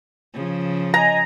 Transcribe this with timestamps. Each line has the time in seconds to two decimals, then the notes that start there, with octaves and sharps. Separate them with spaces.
0.34 C#3 F3
0.94 D#5 G#5 A#5